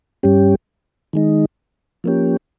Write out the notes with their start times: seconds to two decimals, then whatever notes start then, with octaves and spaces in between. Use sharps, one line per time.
0.23 G2 G3 C#4 G4
1.13 D#3 G#3 D#4
2.04 F3 A#3 C#4 G4